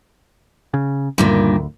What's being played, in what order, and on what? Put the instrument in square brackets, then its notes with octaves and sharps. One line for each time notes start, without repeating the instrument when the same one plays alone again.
[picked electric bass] C#3
[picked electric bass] D2 [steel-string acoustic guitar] G2 A#2 D#3